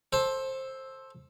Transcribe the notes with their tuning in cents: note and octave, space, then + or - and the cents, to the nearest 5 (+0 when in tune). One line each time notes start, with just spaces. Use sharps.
A4 -5 C5 +15